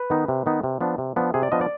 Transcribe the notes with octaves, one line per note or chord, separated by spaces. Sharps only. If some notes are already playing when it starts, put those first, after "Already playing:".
Already playing: B4
D#3 B3 D#4
C3
D#3 B3 D#4
C3
F3 B3 D4
C3
F3 B3 D4
C3 G#4
D5
F3 B3 D4 D#5
D5